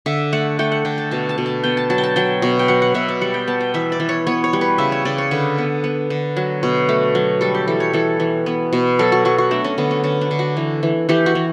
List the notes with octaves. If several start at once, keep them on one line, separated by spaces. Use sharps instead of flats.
D3 E5
A3 F#5
A3 G5
F#5
D3 G5
A5
B2 A5
A5
B2
A5
B3 G5
A5
F#3 A5
G5
A5
F#3 G5
B2
G5
F#3 F#5
F#5
B2 E5
D5
G3 F#5
G5
B3 A5
G5
E3 E5
D5
E3
C#5
B3 C#5
C#5
G3
B4
C#3 E5
C#5
C#3 D5
C#5
D3 B4
B3
B3
D3
F#3
B2
A3
F#3
G3 A4
G4
E3 A4
C#5
E3 A4
E3
B3
B2
F#3 A4
F#4
F#3 F#4
F#4
A3 D4
C#4
D3 B3
C#4
D3 C#4
D4
D3
F#4
E3
E3
E3 G4
F#4
E3